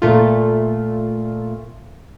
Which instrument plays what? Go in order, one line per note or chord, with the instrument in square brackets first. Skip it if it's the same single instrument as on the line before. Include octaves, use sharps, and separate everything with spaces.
[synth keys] A#2 A3 F4